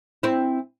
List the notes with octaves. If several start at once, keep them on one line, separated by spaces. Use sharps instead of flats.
C4 E4